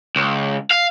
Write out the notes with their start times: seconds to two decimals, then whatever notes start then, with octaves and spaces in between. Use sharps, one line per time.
0.16 C#2
0.71 F5